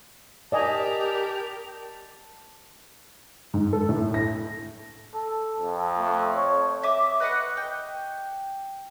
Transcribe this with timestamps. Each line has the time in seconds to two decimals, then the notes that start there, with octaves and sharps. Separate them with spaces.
0.52 G4 A#4 D5 D#5 G#5 A5
3.54 G#2
3.73 A4
3.89 A2
4.14 A#6
5.15 A4
5.60 F2
5.99 A3
6.35 C#5
6.83 E5 D6 D#6
7.20 B4 D#5 F#5 C#6
7.57 G5